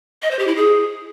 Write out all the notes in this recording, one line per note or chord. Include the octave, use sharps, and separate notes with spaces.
D#5
C5
G4
E4
G#4